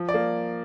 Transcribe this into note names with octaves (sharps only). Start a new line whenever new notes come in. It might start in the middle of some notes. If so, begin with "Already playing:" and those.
Already playing: F3
D5
A#3